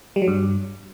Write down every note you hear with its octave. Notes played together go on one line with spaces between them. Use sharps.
G3
F#3
G2